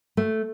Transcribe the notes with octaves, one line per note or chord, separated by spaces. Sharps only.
A3